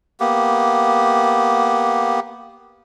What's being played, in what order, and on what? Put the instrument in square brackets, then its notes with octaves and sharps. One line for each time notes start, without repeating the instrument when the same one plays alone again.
[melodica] A#3 B3 G4